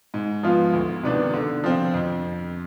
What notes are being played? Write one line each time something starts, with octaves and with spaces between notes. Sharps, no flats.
G#2
F3 B3 F4
D2
C3 D#3 B3 D4
D3
F3 C4 F4
F2